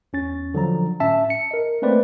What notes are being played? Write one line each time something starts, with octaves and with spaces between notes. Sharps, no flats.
E2 C#4 A6
D3 F3 F#3 A#5
A2 C#4 E5 A5
C#7
A#4 D#5
A3 A#3 C4 B4 C5 D5